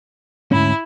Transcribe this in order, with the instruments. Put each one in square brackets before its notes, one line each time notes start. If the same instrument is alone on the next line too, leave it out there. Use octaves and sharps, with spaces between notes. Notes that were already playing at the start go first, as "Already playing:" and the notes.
[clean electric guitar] D2 G#2 C#4 [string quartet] E4